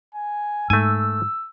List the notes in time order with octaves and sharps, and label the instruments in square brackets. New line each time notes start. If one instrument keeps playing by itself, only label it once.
[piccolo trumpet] G#5
[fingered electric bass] G#2 [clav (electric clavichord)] A3 G#5 [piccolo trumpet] E6